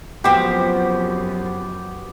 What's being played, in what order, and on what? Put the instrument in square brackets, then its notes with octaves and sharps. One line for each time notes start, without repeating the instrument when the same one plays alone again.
[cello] F#2 [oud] F3 C4 [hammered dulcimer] B3 F#4 [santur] G4